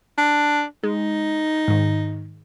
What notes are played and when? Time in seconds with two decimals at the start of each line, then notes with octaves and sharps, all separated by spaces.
0.18 D4
0.84 G#3 D#4
1.68 G#2 D#3